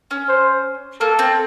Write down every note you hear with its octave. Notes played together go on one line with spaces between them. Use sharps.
C#4
C5
A#3 A4
C4